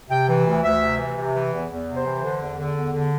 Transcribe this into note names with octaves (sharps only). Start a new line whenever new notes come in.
C3 G5
E3
D2
D2 E5
C3
E3
C3
E3
E2
E2
C3
C5
E3
D3
E2
D3
E2
D3